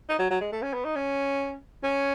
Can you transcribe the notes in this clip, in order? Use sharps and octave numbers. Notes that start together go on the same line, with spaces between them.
D#4
F#3
F#3
G#3
A3
C#4
B3
D#4
C#4
C#4